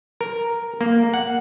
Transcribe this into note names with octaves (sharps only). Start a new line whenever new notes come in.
A#4
A#3
F#5